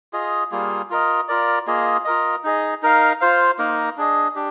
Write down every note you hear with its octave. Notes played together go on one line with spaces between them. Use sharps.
F4 G#4 D#5
G3 A#3 F4 G#4
F4 A#4 D#5
F4 A#4 D5
A#3 F4 G#4 D#5
F4 A#4 D#5
D#4 G#4 D#5
D#4 A#4 F5
F4 C5 F5
A#3 D#4 A#4
D4 G#4 D#5
D4 G4